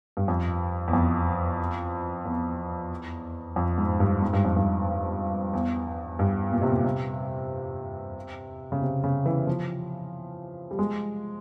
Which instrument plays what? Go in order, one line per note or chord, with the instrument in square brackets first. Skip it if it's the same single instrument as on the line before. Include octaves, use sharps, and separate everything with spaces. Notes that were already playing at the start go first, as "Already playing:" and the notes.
[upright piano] G2
F2
E2
F2
E2
F2
G#2
G2
G#2
G2
F2
G2
E2
G2
A#2
C3
A#2
C3
C#3
C3
C#3
E3
F3
G3
G#3